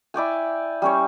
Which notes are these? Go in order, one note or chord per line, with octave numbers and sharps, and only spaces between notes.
E4 D5 G5 G#5
G3 C#4 C#5